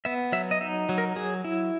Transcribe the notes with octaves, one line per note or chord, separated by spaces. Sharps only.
B3 E5
F#3 E5
D#5
D#4 E5
F#3
A#4
F#3 G#4
E4